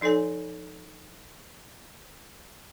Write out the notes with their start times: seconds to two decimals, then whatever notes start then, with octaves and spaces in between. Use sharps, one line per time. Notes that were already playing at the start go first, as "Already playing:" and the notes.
0.01 F3 D#4 A4 C#5 G#5